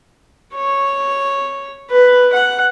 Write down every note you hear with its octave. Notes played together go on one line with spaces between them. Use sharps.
C#5
B4
F#5